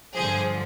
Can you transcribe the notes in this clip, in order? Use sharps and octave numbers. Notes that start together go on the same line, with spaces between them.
G2 D3 F3 G#4 C5